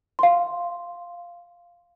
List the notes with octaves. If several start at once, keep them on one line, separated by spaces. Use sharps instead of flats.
F5 C6